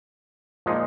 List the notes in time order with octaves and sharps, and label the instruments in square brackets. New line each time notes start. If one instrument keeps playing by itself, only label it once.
[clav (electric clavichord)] A#2 F3 G#3 D#4